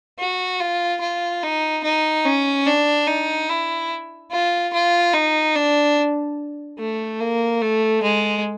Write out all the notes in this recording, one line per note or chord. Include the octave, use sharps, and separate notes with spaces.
F#4
F4
F4
D#4
D#4
C#4
D4
D#4
E4
F4
F4
D#4
D4
A3
A#3
A3
G#3